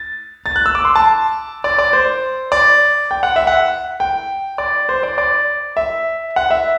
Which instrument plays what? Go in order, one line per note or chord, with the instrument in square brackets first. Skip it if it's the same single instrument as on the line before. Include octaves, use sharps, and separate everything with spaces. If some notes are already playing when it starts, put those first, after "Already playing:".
Already playing: [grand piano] A6
A6
F#6
E6
D6
C6
A5
D5
D5
C5
D5
G5
F#5
E5
F#5
G5
D5
C5
D5
D5
E5
F#5
E5